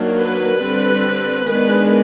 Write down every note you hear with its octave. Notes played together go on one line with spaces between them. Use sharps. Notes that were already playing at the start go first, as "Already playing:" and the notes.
Already playing: D#3 F#3 A#3 D4
B4
D3 G3 C4
D#3 G#3 B3 D4 B4